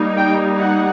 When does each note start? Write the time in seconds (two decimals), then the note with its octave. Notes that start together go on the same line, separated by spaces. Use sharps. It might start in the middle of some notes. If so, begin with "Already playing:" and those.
Already playing: G3 A#3 D#4
0.17 G5
0.57 F#5